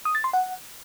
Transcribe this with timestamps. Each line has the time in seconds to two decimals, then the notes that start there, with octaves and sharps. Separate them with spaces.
0.05 D#6
0.15 A6
0.24 C6
0.33 F#5